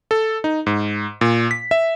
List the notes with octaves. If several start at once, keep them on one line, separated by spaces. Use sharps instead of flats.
A4
D#4
G#2
A#2
B6
E5